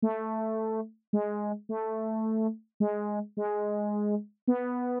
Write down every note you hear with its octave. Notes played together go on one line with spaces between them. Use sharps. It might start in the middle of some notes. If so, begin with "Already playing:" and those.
A3
G#3
A3
G#3
G#3
B3